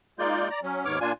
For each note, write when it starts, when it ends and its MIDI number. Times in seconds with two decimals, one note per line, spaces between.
0.19 0.49 56
0.19 0.49 58
0.19 0.49 63
0.19 0.49 65
0.19 0.49 74
0.19 0.49 91
0.50 0.60 74
0.50 0.60 82
0.63 0.85 54
0.63 0.85 61
0.85 0.99 39
0.85 0.99 44
0.85 0.99 59
0.85 0.99 73
0.85 0.99 86
0.85 0.99 89
1.01 1.12 46
1.01 1.12 62
1.01 1.12 65
1.01 1.12 80